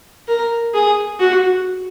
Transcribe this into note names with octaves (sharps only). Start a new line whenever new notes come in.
A#4
G#4
F#4